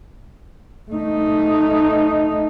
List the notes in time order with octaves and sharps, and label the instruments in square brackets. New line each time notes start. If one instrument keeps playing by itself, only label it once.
[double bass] A3 D#4